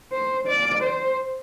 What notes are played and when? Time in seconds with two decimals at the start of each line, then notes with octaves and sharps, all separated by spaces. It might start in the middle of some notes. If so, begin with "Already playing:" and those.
0.12 C5
0.48 D5
0.83 C5